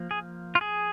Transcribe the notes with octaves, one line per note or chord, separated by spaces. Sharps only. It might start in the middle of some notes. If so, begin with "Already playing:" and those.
Already playing: F3 A#3
G#4
F4
G#4